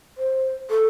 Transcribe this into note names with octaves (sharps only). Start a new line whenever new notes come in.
C5
A4